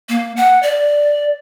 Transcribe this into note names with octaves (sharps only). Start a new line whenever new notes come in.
A#3
F#5
D5